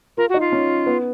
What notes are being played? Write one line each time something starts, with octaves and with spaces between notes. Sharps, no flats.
F4 A#4
F#4
D#4
F4
C#4
B3